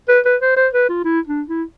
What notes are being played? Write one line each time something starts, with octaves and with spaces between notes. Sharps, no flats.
B4
B4
C5
C5
B4
F4
E4
D4
E4